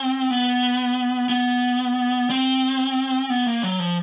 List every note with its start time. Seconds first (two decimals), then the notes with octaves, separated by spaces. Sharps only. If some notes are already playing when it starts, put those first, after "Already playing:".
Already playing: C4
0.30 B3
1.30 B3
2.30 C4
3.30 B3
3.47 A#3
3.63 F#3
3.80 F3